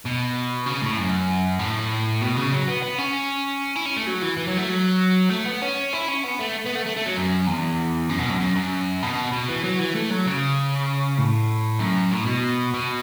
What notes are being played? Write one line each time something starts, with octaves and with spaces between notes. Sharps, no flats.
B2
C#3
A2
F#2
A2
B2
C#3
F#3
B3
B3
C#4
E4
C#4
A3
F#3
E3
E3
F#3
A3
F#3
A3
B3
C#4
E4
C#4
B3
A3
B3
A3
A3
A3
F#3
F#2
E2
F#2
B2
F#2
F#2
F#2
B2
B2
E3
F#3
E3
A3
F#3
C#3
A2
F#2
A2
B2
B2